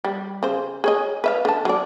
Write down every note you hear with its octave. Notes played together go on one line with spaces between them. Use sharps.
G3
C#3 C5
G#4 C#5 D#5
B4 E5 F5
D3 A5
F#3 D5